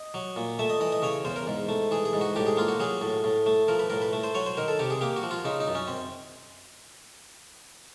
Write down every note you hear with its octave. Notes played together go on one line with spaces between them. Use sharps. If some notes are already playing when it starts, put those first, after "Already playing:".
Already playing: D#5
F#3
A#2
A3 E5
D#5
E3 D#5
D#5
C#3 C#5
E2 C5
A#4
G#2
A3
E3 G#4
G#4
G#2
F#4
A2 G4
G#4
A#3 F4
F#4
F#3 G#4
A2
A2
A3
F3 A#4
B4
A2 A#4
B4
A3
C5
F#3 C#5
C5
D#3 A#4
A4
C3 G4
G#4
A#3 G4
F#4
F3
F4
C#3 D#4
D#4
F#2
C#4
C4